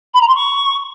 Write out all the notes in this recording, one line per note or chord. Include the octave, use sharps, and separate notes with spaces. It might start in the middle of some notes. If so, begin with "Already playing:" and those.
B5
A#5
C6
C#6